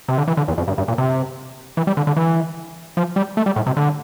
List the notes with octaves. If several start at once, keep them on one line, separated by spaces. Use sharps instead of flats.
C3
D3
E3
D3
E2
F2
G2
G2
A#2
C3
E3
G3
D3
D3
E3
F3
G3
A3
G3
A2
C3
D3